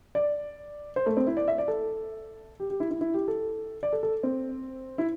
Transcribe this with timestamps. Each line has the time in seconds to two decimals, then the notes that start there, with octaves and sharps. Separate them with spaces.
0.15 D5
0.96 C5
1.06 A3
1.17 C4
1.27 E4
1.37 D5
1.48 E5
1.58 D5
1.68 A4
2.60 G4
2.70 G4
2.80 E4
2.91 E4
3.01 E4
3.14 G4
3.28 A4
3.83 D5
3.93 A4
4.03 A4
4.23 C4
4.98 E4